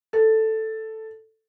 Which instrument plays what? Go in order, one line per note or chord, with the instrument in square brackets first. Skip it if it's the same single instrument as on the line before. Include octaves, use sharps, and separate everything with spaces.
[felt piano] A4